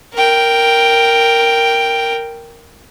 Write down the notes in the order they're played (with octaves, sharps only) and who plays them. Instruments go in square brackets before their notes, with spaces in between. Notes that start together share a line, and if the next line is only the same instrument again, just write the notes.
[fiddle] A#4 G5